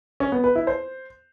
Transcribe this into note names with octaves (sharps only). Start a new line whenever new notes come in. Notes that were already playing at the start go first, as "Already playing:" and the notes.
C#4
B3
B4
E4
C5